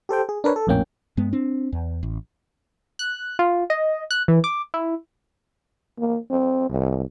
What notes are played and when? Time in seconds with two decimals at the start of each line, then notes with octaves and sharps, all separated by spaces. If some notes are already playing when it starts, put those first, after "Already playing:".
0.09 G4 A4 C5 G5
0.29 G#4
0.44 D4 A#4 B4 C#5
0.56 A4
0.67 A#1 F2 A2 A#3 C#4 G5
1.17 G2 G#3 B3
1.33 C4 D4
1.73 E2
2.03 A1
2.99 F#6
3.39 F4
3.70 D#5
4.11 F#6
4.28 E3
4.44 D6
4.74 E4
5.99 A#3
6.30 C4
6.70 C2